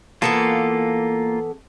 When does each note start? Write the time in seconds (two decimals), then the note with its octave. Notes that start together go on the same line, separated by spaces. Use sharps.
0.22 E3 A#3 B3 F4 A4